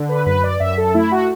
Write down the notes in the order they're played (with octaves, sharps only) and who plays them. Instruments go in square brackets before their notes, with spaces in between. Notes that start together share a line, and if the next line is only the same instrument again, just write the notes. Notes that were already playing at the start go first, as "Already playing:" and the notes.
Already playing: [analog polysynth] D3
B4
F#2 B4
D5
F#2 E5
A4
A3 E4
F#4